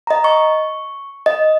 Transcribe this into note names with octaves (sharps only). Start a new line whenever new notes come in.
D#5 A#5
C#6
D#5